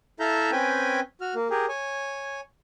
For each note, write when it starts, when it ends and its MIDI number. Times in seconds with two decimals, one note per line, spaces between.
0.20 0.51 64
0.20 0.51 69
0.20 0.51 76
0.20 0.51 77
0.20 0.51 82
0.20 0.51 91
0.52 1.00 60
0.52 1.00 61
0.52 1.00 71
0.52 1.00 79
0.52 1.00 80
1.21 1.34 66
1.21 1.34 89
1.35 1.48 58
1.50 1.66 67
1.50 1.66 68
1.50 1.66 70
1.68 2.40 73
1.68 2.40 80